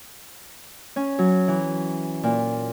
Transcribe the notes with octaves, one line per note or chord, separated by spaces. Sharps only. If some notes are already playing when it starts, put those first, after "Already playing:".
C#4
F#3
E3
A#2